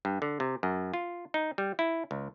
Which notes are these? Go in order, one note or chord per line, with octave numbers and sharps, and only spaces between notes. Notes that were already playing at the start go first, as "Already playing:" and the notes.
G2
D3
C3
F#2
F4
D#4
G3
E4
C#2